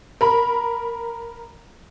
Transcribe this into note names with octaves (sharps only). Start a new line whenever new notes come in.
A#4 B5